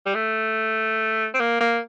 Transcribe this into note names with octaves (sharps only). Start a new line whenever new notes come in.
G3
A3
C4
A#3
A#3